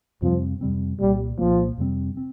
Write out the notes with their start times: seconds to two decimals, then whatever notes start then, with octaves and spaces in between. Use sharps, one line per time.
0.22 F2 C3 F3 G3 C4
0.61 F2 C3 G3 C4
1.00 C2 A#2 G3 A#3
1.39 C2 A#2 F3 A#3
1.78 F2 C3 G3 C4
2.17 C4